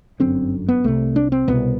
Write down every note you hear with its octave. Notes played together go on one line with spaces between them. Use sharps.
G1 F#2 D3 C4
B3
C2 C3 A3
D4
C4
C2 B2 B3